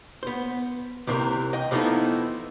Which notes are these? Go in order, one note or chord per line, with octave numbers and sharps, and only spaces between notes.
B3 C5
C2 C3 E3 C4 A#4
D#5 G5
E3 F3 A3 B3 D#4 E4